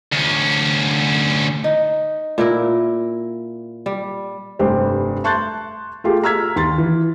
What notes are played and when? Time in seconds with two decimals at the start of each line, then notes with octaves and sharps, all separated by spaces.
0.12 D2 C#4
1.64 D#4
2.38 A#2 E4 A#4
3.86 G3
4.59 F1 G2 G4 C5
5.24 A5 C6 C#6 F#6 G6 A6
6.04 A3 F4 G4 G#4
6.24 A#5 E6 F6 G#6 B6
6.56 D#2 C6 A6
6.78 E3